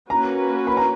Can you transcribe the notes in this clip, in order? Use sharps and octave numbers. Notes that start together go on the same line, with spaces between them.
A#3 C#4 F#4 B4 A#5
B5
A#5